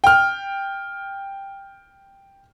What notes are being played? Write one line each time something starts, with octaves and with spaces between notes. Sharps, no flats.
G5 F6